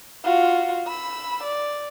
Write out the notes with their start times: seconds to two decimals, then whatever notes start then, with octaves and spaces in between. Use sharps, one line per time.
0.24 F4 F#4
0.88 B5 E6
1.44 D5